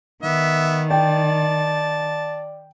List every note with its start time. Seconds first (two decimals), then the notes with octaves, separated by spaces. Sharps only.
0.23 D#3 B3 E5
0.91 D5 G5 A5